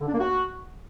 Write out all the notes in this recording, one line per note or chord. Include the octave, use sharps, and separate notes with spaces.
D3
D4
A#3
F#4